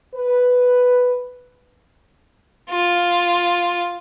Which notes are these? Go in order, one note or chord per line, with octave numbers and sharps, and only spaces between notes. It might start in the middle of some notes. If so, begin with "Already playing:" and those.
B4
F4